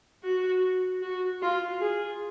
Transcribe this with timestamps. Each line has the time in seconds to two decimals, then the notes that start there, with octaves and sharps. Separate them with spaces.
0.23 F#4
1.02 F#4
1.42 F4
1.81 G#4